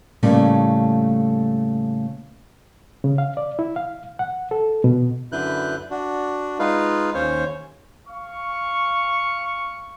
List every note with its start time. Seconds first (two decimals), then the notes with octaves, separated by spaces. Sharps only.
0.23 A2 C#3 G3 A3 A#3
3.04 C#3
3.18 F5
3.37 D5
3.59 E4
3.76 F5
4.19 F#5
4.51 A4
4.84 B2
5.32 F#2 D3 E4 B4 F#6 G6
5.91 D4 F#4
6.59 G#3 D#4 F4 B4 F5
7.15 D#2 C#4 C5 C#5
8.08 F5 C#6